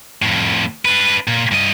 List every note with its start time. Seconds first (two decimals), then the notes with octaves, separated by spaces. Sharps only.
0.22 F2 A2
0.85 D4 B4
1.27 A#2
1.51 G2 D#5